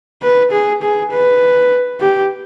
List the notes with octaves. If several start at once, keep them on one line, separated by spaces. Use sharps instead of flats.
B4
G#4
G#4
B4
G4